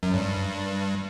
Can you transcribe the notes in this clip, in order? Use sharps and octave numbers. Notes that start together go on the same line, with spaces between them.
F#2
G2